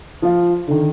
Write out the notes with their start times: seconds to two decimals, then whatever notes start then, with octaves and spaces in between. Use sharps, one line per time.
0.22 F3 F5
0.67 D3 D#3